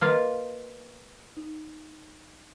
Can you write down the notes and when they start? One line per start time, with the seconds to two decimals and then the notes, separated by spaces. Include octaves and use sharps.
0.01 A#3 F4 B4 C5 D#5 F5
1.37 D#4